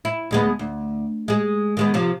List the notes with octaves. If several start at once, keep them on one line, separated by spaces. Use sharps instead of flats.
E4
D2 G#3 B3
D2
G#3 G#4
D#3 G#3 B3
C3 F3